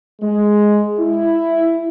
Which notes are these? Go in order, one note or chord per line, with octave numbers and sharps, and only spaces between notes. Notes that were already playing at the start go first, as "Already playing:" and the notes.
G#3
E4